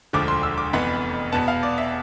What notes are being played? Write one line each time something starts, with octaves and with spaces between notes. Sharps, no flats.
E1 D2 D3 F3 D6
C6
E6
D6
F1 F2 E3 B3 B5
E2 B2 B3 A5
F5
D5
E5